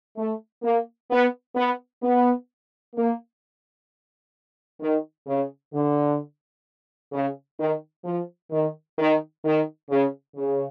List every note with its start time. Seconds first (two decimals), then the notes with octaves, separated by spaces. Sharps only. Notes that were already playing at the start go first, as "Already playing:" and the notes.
0.16 A3
0.63 A#3
1.10 B3
1.56 B3
2.03 B3
2.96 A#3
4.80 D#3
5.27 C#3
5.73 D3
7.12 C#3
7.58 D#3
8.05 F3
8.51 D#3
8.99 D#3
9.45 D#3
9.90 C#3
10.37 C#3